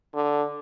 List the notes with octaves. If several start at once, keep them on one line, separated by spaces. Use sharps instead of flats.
D3